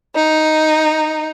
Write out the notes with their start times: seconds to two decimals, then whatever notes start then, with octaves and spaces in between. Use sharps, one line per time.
0.14 D#4